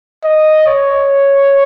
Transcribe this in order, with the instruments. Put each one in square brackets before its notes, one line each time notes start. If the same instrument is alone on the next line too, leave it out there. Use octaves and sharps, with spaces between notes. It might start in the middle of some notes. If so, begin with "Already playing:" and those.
[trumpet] D#5
C#5